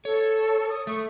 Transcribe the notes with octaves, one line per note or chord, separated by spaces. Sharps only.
A4 C#5
D#6
A3 C#6